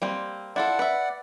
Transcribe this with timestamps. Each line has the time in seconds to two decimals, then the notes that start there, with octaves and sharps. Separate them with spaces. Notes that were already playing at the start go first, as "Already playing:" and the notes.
0.02 G3 A#3 C4
0.56 E4 F4 A4 D5 F#5
0.79 B4 E5